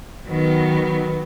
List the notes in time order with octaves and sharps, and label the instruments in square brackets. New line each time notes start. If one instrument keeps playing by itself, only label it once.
[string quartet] D#3 F#3 B3